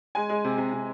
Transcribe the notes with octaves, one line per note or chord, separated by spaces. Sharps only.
G#3 G#5
G#3
C3
C3
C3